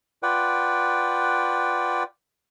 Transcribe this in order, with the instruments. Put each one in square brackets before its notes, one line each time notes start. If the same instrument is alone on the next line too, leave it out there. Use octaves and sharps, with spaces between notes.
[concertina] F4 B4 D5 F#5 G5